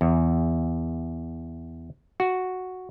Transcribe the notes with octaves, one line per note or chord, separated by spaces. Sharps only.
E2
F#4